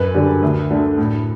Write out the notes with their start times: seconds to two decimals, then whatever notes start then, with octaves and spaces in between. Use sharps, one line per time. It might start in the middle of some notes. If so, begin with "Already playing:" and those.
Already playing: F#2 B4
0.14 D3 G3
0.42 D2
0.71 D3 A3
0.98 A2